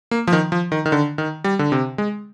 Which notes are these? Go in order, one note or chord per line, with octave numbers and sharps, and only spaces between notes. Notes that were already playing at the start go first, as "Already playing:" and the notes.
A#3
F3
D#3
F3
D#3
D#3
D3
D#3
G3
D3
C3
G#3